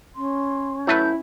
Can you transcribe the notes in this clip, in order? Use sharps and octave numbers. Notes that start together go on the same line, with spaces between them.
C#4 C6
F#3 A3 E4 B4 G6